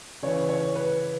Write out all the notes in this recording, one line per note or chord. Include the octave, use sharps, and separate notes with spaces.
C#3 E3 C#5
C#5
B4